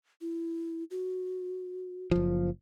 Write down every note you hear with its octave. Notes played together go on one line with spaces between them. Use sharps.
E4
F#4
F#1 F3